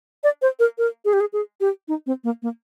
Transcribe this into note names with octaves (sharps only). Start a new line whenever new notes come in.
D5
C5
A#4
A#4
G#4
G4
G#4
G#4
G4
D#4
C4
A#3
A#3